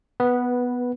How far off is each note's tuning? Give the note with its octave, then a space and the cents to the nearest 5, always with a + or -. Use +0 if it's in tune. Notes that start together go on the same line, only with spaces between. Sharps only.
B3 +0 B4 -10